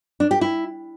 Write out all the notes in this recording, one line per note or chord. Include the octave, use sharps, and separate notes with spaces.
D4
G4
E4